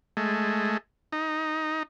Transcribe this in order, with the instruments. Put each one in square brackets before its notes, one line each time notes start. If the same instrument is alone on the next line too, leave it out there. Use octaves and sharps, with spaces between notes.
[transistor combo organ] G#3 A3
D#4